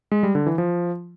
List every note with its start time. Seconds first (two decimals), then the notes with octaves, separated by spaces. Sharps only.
0.12 G#3
0.23 G3
0.35 D3
0.46 E3
0.58 F3